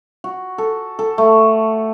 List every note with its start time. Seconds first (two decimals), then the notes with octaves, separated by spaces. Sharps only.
0.24 F#4
0.58 A4
0.99 A4
1.18 A3